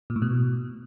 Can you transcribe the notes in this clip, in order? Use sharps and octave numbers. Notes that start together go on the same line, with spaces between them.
A#2
A2
B2